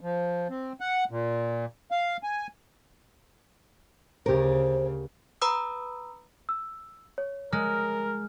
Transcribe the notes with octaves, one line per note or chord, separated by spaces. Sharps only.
F3
C4
F#5
A#2
F5
G#5
D2 C#3 G4 A#4 C5
B4 A#5 B5 D#6 E6
E6
C#5
G#3 A#4 F6